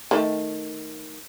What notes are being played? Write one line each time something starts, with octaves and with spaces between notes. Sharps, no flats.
D#3 A3